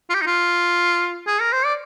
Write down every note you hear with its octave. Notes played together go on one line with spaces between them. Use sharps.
F4
G4
D#4
F4
G#4
A#4
C5
D5